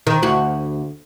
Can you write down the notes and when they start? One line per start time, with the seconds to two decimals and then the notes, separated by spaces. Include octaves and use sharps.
0.07 D#3
0.23 D2 F#4